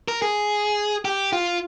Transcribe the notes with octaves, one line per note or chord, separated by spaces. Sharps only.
A#4
G#4
G4
F4